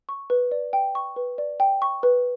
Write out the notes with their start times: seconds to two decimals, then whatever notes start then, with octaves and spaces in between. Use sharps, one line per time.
0.09 C#6
0.30 B4
0.52 D5
0.73 G5
0.95 C#6
1.16 B4
1.38 D5
1.60 G5
1.82 C#6
2.03 B4